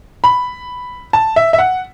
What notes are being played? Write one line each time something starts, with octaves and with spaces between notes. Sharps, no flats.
B5
A5
E5
E5
F#5